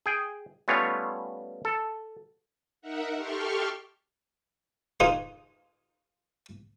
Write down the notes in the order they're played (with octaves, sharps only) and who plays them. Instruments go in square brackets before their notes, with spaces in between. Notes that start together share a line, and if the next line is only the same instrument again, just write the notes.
[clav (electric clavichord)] G#4 G5
G3 A3 B3 C#4 F4 C#5
A4
[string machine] D#4 A#4 E5 F#5
G4 A4 C6 C#6 F6
[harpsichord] D#3 D#4 F4 F#4 G#4 C5